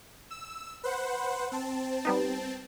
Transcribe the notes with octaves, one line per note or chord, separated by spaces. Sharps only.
E6
B4 C5 F#5
C4 A5
G3 B3 D#4